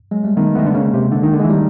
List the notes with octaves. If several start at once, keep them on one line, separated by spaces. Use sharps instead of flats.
F#3 G#3
G3 A3
D#3 A3 B3
D#3 A3 B3
D3
C#3 G#3 A#3
C3
D3
D#3
D3
E3 G#3
D#3 G3 A3